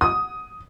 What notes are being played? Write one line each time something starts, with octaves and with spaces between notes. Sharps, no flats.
D#6